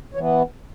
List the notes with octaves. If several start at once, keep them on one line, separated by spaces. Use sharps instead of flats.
E3 B3 C#5